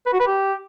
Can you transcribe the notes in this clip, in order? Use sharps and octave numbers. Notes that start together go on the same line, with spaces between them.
B4
F#4
B4
G4